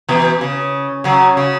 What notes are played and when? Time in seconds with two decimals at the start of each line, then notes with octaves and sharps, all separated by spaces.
0.09 B2 E3
0.41 C#3
1.04 C#3 F#3
1.37 C#3